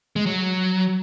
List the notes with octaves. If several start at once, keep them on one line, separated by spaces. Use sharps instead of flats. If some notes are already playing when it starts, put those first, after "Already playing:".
G#3
F#3